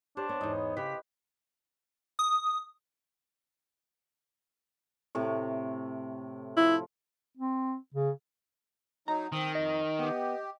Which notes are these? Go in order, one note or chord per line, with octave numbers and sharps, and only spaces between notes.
D4 G4 C5 C#5
B3 C#5
E2 G#2 D#5
B3
C#3 G4 B4 B6
D#6
A2 C3 A3
F3 E4
C4
C#3
F#3 D#4 A#5
D#3 C4 D#6
F2 D#5
B3 G4